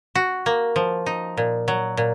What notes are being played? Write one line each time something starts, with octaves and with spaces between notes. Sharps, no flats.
F#4
A#3
F3
D#4
A#2
F#3
A#2